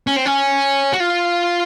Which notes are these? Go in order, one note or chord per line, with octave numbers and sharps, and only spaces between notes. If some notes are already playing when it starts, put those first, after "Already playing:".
C#4
C4
C#4
F#4
F4